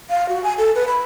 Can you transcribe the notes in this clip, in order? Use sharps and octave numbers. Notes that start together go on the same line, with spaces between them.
F5
F#4
G#5
A4
B4
B5